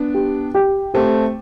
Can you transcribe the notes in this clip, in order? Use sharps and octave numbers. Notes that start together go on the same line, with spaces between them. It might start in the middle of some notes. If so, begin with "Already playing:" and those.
Already playing: B3 D4
G4
G4
A3 C4 G4